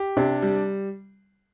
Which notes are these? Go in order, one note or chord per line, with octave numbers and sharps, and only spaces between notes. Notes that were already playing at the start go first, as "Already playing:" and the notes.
Already playing: G4
C3 D4
G3